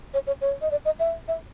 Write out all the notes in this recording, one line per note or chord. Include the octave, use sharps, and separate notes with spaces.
C#5
C#5
C#5
D#5
D5
D#5
E5
E5